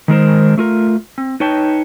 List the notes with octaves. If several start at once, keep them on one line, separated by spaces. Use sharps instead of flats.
D#3 G#3 A#4 C5
A3 F4 A#4
C4
D#4 B4 C#5 G5 A5